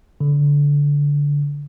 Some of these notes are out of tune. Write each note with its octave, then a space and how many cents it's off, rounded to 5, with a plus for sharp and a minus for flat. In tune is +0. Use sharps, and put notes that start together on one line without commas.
D3 -20